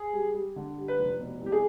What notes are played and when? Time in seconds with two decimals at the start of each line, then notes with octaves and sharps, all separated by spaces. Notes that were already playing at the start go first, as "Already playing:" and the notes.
Already playing: G#4
0.13 G3
0.34 G3
0.56 D3
0.77 G3
0.88 B4
0.99 F1
1.20 B2
1.41 C2
1.46 G4
1.52 G#4